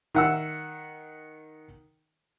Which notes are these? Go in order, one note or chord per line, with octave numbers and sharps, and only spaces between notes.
D#3 F#5 E6